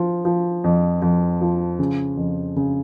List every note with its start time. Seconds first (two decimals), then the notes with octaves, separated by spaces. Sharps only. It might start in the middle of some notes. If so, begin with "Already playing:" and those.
Already playing: F3
0.25 F3
0.64 F2
1.02 F2
1.41 F3
1.79 C#3
2.17 F2
2.56 C#3